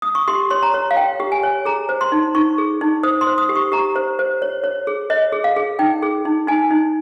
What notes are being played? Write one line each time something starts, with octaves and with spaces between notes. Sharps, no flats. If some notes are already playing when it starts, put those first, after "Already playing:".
D#6
C#6
G4 C6
C#5 C6
A#5
C#5
F5
C#5 G5
G4
G#5
C#5
G#4 A#5
C5
C6
D#4
D#4 C#6
G#4
D#4
C5 D#6
C6
C5
D#6
G4
C#6
G4 A#5
C5
C5
C#5
C#5
G#4
C#5 D#5
G#4
F5
G#4
D#4 G5
G#4
D#4
D#4 G#5
D#4